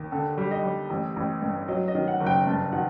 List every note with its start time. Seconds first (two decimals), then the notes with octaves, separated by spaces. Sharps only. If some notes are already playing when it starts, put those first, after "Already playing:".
Already playing: D#2
0.12 D3 A4
0.38 G3
0.51 D#5
0.64 G3
0.90 A1
1.16 A1
1.42 G2
1.68 F#3 D#5
1.88 D#5
1.95 D#3
2.08 F#5
2.20 F#1
2.26 G5
2.47 G2 A5
2.72 D#3 F#5